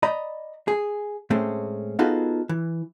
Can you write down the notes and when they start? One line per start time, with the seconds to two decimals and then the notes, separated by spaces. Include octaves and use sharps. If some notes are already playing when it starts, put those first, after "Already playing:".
0.03 D5 D#5 A#5 B5
0.68 G#4
1.30 A2 G#3 A3 C4 C#4
1.99 B3 D#4 F4 F#4 G#4 A4
2.49 E3